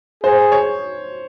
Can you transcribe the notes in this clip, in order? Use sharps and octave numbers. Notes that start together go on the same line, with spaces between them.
G#4 C5
C#5